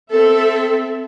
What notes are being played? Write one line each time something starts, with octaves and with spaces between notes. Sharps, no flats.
C4 A4 E5